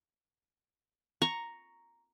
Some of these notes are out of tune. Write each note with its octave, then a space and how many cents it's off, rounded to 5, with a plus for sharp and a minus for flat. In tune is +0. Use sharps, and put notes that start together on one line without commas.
A#5 +0 C#6 +0